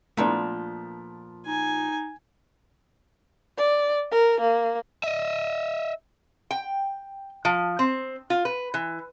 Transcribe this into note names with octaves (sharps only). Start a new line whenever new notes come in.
A#2 F3 A3 B3 D4
D#4 G#5
D5
A#4
A#3
D#5 E5
G5
F3
C4
F4
B4
E3